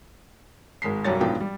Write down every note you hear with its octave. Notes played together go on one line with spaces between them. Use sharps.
G#1 G#3 B6 C7
B1 F#2 G3 F#4 C#5 A6
B1 G#2 F3 B3 D4 G5
G3